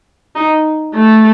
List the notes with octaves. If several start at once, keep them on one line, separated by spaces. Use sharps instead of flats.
D#4
A3